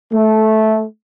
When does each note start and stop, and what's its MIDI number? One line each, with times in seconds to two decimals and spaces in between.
0.13 0.81 57